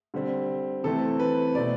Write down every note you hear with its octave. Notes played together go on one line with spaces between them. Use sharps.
D3 G3 C4
C3 E3 A3 C4 A4
B4
B2 A3 C4 D5